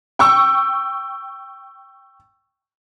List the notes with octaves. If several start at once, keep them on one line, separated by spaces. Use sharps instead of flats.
G5 C#6 E6